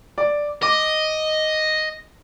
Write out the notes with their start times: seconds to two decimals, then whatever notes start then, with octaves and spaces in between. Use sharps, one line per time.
0.18 D5
0.63 D#5 D6